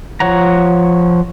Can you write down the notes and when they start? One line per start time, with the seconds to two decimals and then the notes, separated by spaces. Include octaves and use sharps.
0.20 F3 C#5 F#5 A#5